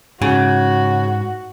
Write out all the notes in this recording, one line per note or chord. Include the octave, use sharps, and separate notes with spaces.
G#2 C#3 F#4